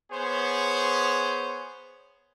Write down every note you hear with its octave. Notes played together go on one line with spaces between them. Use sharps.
B3 G#4 C5 C#5